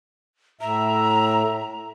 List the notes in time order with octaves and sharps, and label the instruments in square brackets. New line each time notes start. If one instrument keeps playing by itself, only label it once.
[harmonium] A2 E5 [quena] A#5